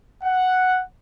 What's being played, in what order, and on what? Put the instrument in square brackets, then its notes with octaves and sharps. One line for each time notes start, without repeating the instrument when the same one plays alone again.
[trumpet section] F#5